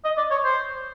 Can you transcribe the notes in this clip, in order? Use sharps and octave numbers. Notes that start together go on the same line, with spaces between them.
D#5
D5
C#5
C5